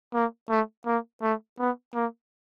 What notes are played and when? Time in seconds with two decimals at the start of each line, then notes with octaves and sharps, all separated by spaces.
0.14 A#3
0.50 A3
0.86 A#3
1.22 A3
1.59 B3
1.95 A#3